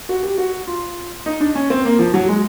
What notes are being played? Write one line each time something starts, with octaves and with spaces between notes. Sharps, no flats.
F#4
G4
F#4
F4
D#4
D4
C#4
C4
A#3
F3
F#3
G#3